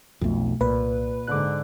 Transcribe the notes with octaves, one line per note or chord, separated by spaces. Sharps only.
B1 F2 B2 A3
C2 A#2 B4
G#2 D3 D6 F#6